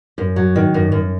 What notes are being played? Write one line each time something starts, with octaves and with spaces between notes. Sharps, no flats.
F#2
F#3
D#3
F#2
F#2